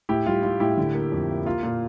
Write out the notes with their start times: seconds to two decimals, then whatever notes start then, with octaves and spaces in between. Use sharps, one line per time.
0.09 A2 E4 G4
0.26 G3 F4
0.43 G3 F4
0.60 A2 E4 G4
0.78 D3
0.95 A#3
1.12 F2
1.29 A#3
1.46 A#3 F4
1.63 A#2